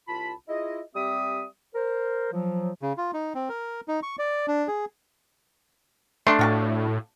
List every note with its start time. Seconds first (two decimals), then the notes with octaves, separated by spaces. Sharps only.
0.07 C2 F4 A5 B5
0.48 E4 F4 G#4 D#5
0.94 G3 C4 G4 E5 D#6
1.74 A#4 C5
2.32 F3 F#3
2.82 C#3
2.98 F4
3.14 D#4
3.35 C4
3.49 A#4
3.88 D#4
4.03 C#6
4.19 D5
4.48 D4
4.68 G#4
6.27 A3 D4 C6
6.39 A2 F4 F#4 A5